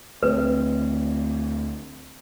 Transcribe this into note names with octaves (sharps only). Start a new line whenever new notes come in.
D2 C4 B4